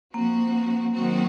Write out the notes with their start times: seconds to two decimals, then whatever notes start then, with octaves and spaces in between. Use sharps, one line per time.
0.14 F3 A#3 C4 F#4
0.93 D#3 F#3 C4 F#4